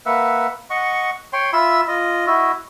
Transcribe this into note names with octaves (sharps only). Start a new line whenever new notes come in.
A#3 B4 E5 F#5
D#5 F#5 C#6
C#5 G5 C6
F4 E5 B5 E6
F4 D#5
E4 F#4 D#5 E5